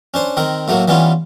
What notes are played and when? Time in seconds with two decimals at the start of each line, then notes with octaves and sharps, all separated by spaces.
0.14 C#4 D4 C5
0.37 D#3 C4 A#4
0.68 A2 F#3 A3 A#3
0.88 E3 G3 B3 C#4 F4